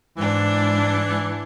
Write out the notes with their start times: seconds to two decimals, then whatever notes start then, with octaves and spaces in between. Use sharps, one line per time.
0.17 G#2 E3 D4